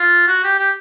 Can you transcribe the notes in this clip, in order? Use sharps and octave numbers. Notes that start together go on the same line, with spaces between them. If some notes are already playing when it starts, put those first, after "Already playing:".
Already playing: F4
F#4
G4
G4